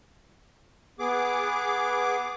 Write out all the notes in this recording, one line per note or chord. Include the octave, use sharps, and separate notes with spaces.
B3 G#4 D6